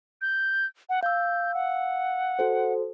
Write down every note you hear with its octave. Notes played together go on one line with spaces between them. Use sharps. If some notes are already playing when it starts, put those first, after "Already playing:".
G6
F#5
F5 E6 G6
F#5
F#4 A4 C5